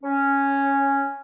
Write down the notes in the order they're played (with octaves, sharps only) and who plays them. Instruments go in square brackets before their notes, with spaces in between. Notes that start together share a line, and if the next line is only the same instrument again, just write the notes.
[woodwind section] C#4